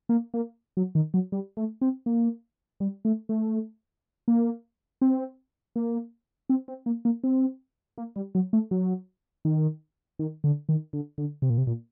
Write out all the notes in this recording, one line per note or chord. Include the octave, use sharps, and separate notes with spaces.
A#3
A#3
F#3
D#3
F#3
G3
A3
C4
A#3
G3
A3
A3
A#3
C4
A#3
C4
C4
A#3
A#3
C4
A#3
G3
F#3
A3
F#3
D#3
D#3
D3
D#3
D3
D3
C3
A#2
C3
A#2